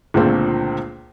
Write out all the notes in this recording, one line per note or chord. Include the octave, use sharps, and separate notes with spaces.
C#2 A#2 D3 A3 A#3 C4